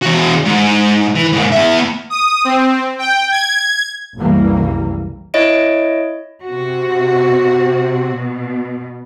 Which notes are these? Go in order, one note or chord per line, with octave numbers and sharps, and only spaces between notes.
E2 F#4
G#2
E3
G#2 A#3
B3 E5
D#6
C4
G5
G#6
F#1 C2 E3 G3 A#3
E4 C#5 D#5 D7
C3 F#4
B2